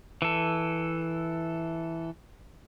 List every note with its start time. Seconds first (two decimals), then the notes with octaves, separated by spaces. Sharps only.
0.22 E3 A4